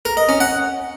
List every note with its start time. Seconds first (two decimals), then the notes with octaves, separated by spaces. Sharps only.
0.05 A#4
0.17 D#5
0.29 C#4
0.40 F#5